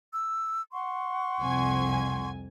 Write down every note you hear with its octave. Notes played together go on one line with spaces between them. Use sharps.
E6
F#5 C6 C#6
C2 F2 G#5